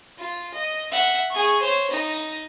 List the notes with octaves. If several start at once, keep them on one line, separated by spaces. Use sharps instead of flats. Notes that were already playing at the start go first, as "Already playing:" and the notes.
F4
D#5
E5 F#5
G#4 C#6
C5 C#5
D#4